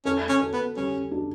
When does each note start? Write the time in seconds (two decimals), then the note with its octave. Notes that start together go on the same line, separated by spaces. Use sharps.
0.05 C#4 A4
0.29 C#4
0.40 A4
0.53 B3
0.76 G3 C#4
1.12 D4